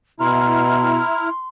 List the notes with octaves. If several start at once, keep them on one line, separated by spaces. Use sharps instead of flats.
B2 E4 A#5 C6 F6